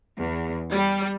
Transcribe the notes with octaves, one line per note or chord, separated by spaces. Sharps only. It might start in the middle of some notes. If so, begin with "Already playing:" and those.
E2
G3